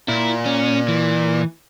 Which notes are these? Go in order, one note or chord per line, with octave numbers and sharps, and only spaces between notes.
A#2 E4
C#4
E3